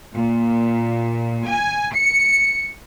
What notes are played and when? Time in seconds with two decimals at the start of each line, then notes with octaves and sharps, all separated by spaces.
0.14 A#2
1.45 G#5
1.93 C#7